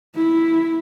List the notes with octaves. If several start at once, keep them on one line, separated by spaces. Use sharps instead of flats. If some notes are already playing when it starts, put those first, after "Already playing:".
E4